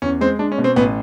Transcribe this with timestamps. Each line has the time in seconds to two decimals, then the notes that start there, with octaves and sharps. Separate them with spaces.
0.02 E2 C#4
0.21 G#3 C4
0.39 G#3 D4
0.52 C#4
0.58 B2
0.64 C4
0.76 A1 B3